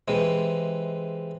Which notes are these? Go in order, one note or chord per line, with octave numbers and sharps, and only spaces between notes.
C3 E3 G#3